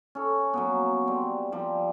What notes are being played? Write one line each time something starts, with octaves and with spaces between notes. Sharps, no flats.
C#4 A4
F#3 A#3 B3
G3 C4
F3 G3